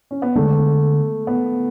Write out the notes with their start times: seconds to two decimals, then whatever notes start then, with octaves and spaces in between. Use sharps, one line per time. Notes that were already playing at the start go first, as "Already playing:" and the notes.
0.11 C#4
0.22 B3
0.36 D3 G#3 A3 D4
1.27 B3